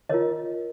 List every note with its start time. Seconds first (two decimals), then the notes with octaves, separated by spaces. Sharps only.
0.09 F4 A#4 C#5 D#5